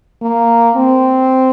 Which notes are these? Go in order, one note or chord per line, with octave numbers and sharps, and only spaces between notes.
A#3
C4